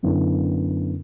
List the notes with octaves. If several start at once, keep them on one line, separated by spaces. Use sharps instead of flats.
F#2 D3 B3 E4